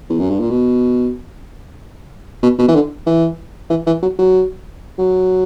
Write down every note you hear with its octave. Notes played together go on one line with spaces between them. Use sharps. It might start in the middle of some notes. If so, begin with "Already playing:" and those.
E2
F#2
G2
A#2
B2
B2
B2
E3
D3
E3
E3
E3
F#3
F#3
F#3